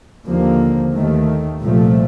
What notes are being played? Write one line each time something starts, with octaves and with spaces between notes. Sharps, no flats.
D#2 D3 F3 A#3
D#2 D#3 A3
C2 A#2 F3 A3